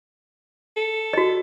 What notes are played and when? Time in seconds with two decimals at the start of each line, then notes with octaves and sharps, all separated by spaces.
0.77 A4
1.13 F#4 D#5